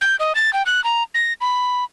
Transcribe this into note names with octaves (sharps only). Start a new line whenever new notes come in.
G6
D#5
A6
G5
F#6
A#5
A#6
B5